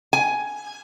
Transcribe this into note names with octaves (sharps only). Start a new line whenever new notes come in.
G#5